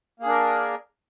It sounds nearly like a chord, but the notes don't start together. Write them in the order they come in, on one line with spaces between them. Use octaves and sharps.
A#3 G#4 D4 A#4